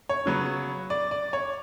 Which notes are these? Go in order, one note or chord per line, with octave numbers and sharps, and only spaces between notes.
C#5
C#3 F#3 B3
D5
D5
C#5